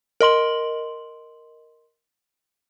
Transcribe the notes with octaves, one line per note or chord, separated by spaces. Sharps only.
A#4 D#5 C6 F#7